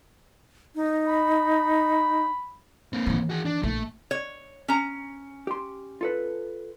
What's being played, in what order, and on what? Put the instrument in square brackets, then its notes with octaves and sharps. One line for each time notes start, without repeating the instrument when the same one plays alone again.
[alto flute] D#4
[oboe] B5
[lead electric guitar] A#3 C4
[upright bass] D#3 E3
[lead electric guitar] F#4 G#4
D4
[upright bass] A#1 [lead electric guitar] A3
[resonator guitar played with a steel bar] C#5
C#4 A#5
[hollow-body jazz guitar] G4 C6
F4 A4 B4